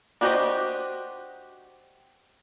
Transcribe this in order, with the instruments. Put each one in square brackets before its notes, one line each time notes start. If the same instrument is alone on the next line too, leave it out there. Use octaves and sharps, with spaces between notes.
[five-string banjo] D4 F#4 G4 C5 D#5